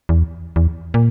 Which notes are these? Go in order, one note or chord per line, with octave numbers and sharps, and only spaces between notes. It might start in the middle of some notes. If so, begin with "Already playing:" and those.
E2
E2
A#2